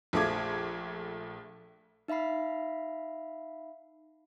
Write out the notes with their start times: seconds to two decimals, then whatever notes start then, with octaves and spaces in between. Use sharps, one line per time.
0.13 A#1 F3 A3 D6 G#6
2.08 D#4 E5 F5 B5 C7